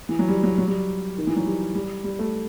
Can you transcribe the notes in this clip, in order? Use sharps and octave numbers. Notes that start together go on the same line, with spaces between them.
E3
F#3
G3
F#3
F#3
G3
D#3
E3
F#3
G3
G3
G3
A3